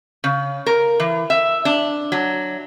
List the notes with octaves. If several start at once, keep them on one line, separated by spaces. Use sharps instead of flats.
C#3
A#4
E3
E5
D4
F#3